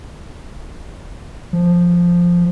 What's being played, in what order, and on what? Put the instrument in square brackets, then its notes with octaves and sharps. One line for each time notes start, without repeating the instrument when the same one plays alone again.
[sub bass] F3